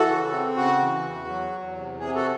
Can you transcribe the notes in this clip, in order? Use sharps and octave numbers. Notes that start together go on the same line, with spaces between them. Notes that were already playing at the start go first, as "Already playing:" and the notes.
Already playing: E3 F#4 A4
C#3
C4
C#3 F#4
E3
E2
F#3
E2
C3
C3 G#4
F#4 A4